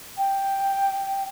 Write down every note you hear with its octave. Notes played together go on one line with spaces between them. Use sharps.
G5